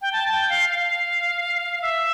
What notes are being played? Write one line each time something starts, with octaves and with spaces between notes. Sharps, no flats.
G5
A5
G5
F5
F5
E5